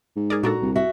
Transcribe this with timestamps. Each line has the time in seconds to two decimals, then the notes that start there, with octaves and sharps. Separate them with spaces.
0.16 G#2
0.30 G#4 A#4 D5
0.43 A#2 D4 F#4 A4 A#5
0.62 C2
0.76 F#4 E5